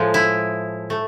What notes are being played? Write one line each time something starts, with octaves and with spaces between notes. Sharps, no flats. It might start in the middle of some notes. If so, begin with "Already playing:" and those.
Already playing: A2 F3 G#3
E4
A3